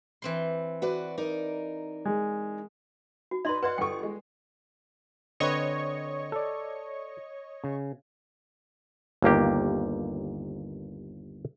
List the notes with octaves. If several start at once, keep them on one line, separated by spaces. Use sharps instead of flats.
E3 C4 C6
F#4 B4 D5
D#4 A#4 D5
G#3
F#4
D#4 B4 D5 D#5 C6
B4 D5 D#5 F#5 C6
G1 A4 G5 C#6
G#3
D3 C4 B4 C#5 D#5 C#6
A4 D5
C#3
G1 D#2 A#3 G4